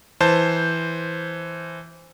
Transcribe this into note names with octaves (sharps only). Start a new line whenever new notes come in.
E3 C5 A5 G6